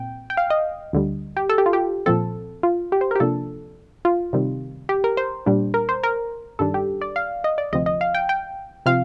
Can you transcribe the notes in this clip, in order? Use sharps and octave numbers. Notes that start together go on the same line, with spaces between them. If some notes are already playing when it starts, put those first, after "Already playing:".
Already playing: A#2 C4 G5
G5
F5
D#5
D2 D3 G3
G4
A4
G4
F4
G4
A#2 F3 C4 A4
F4
G4
C5
A#4
G4
C3 F3 A#3 D4 A4
F4
C3 D#3 G3 C4
G4
A#4
C5
A#2 G3 D4
A#4
C5
A#4
G2 D#3 G3 D4 A4
G4
D5
F5
D#5
D5
D2 C3 F3 C4 D#5
D#5
F5
G5
G5
C3 F3 C4 F5